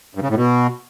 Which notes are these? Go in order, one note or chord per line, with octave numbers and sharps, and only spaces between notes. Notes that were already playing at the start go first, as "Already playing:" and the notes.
G2
C#3
A2
B2